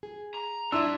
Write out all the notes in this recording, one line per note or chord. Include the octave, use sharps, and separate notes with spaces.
G#4
A#5
G2 D4 E4 F#4 E5 C6 E6